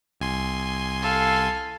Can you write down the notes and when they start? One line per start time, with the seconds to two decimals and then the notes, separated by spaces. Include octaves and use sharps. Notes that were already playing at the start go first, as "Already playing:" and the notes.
0.21 C2 G#5 C6
1.02 A4 F5